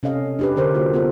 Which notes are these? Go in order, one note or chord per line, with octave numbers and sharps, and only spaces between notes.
C3 C#4 A4 D#5 F5
D4 G4 B4
D3 A#4 C5
A#3 F4 F#4
B3 F4 A4 C5